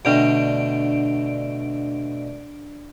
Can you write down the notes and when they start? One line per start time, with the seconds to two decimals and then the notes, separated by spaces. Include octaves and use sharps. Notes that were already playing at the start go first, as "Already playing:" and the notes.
0.05 B2 D3 A3 D4 D5 D7